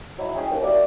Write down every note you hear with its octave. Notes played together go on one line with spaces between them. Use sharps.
F#3 D#4 E4
C#4 G#4 G5
D#2
A#3 E4 F#4 D5